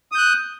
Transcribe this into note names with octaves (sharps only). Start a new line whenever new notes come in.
D#6 F#6 G6